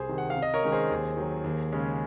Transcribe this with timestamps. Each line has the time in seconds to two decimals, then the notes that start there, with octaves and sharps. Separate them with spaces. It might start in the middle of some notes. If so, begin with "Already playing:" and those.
Already playing: C2 G#4 C5
0.09 C3 D#3
0.18 F#5
0.30 F5
0.36 C3
0.42 D#5
0.54 A#4 C#5
0.64 D#3 G#3 C#4
0.72 G#4 C5
0.91 D#2
1.17 D#3 F#3
1.44 D#2
1.72 C#3 G#3 C#4